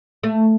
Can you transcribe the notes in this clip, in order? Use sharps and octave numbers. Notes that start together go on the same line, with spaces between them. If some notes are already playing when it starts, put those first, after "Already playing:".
A3